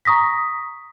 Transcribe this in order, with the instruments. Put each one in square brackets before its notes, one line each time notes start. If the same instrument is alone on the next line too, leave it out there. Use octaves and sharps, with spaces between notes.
[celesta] A#5 C#6 D#6 A#6 B6